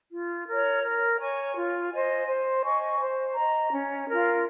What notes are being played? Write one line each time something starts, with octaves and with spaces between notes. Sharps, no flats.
F4
A#4 C#5
A#4
C#5 G#5 C#6
F4
C5 D#5 G#5
C5
D#5 G#5 C#6
C5
D#5 A#5
C#4
F4 A#4